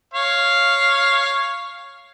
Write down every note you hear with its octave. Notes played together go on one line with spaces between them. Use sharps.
C#5 F5